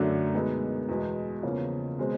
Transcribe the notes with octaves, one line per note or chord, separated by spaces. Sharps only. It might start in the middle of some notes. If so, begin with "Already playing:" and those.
Already playing: F#2 D3 F#3 A3 D4
B2 G#3 B3 D#4
E2 B2 G#3
E2 C#3 F3 A#3 C#4
B2 G#3 C4